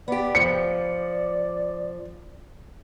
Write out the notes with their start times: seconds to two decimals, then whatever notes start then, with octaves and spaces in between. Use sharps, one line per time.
0.08 B3 G4 D5
0.35 F3 D5 C#7